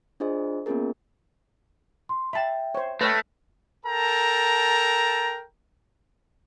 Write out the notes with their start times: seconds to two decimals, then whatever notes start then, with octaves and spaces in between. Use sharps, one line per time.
0.20 D4 F4 G#4 C5 D#5
0.66 A#3 B3 C#4 F4 G#4 A#4
2.09 C6
2.33 E5 G5 A5 B5
2.75 C5 C#5
3.01 A3 B4 C#5 G5 F6 F#6 A#6
3.85 A4 A#4 G5 A5 A#5